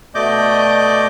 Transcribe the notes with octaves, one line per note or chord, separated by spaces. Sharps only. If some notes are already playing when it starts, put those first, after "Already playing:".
B2 A3 D5 D#5 D6 G6